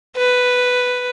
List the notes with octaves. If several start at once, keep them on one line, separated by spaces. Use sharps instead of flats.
B4